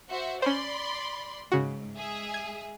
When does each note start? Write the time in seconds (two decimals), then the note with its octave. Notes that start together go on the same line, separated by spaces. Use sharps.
0.10 F#4 C5 E5
0.42 C#4 C5 D5 B5 C6
1.52 G#2 C#3 F#4
1.95 G#3 G#4 E5
2.34 G#6